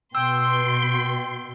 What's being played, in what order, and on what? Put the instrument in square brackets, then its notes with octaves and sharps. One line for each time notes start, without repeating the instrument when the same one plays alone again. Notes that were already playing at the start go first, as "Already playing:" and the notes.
[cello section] B2 [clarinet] G5 [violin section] C6 [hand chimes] E6